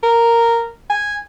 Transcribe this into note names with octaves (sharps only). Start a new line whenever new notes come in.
A#4
G#5